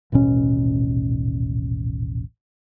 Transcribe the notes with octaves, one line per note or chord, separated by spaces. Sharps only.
D#1 A1 B2 C#4